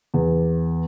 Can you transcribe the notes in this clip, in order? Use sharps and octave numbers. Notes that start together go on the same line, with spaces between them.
E2